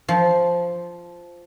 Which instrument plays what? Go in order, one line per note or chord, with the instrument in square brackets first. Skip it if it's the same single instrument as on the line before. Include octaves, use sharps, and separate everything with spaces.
[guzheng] F3